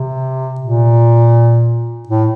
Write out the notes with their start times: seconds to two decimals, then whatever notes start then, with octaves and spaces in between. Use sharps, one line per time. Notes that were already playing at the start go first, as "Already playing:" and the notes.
Already playing: C3
0.61 A#2
2.09 A2